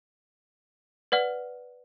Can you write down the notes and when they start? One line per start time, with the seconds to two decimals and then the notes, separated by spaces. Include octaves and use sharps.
1.12 B4 D5 F#5 F6